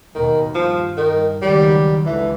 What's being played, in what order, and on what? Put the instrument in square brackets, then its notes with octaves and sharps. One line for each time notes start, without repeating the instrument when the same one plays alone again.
[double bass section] D#2 B2 [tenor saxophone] D#3
[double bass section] G2 [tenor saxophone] F3
[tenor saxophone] D#3
[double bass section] C#2 D#3 F#3 [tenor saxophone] G3
[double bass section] C#2 D3 [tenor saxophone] E3